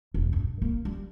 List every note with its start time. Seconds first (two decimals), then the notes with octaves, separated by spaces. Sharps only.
0.14 E1
0.33 G2
0.62 A#3
0.85 G3